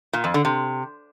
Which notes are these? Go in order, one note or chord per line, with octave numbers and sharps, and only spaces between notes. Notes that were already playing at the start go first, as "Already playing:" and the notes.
A#2
F2
D3
C3